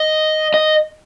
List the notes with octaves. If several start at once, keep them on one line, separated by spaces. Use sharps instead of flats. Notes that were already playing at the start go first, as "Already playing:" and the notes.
Already playing: D#5
D#5